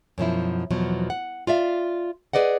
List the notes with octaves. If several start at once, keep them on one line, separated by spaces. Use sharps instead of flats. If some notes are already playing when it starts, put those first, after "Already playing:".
F#2 B2 F3 E4
E2 B2 F3 F#3
F#5
F4 D5 E5 F5
G#4 B4 D5 D#5 F#5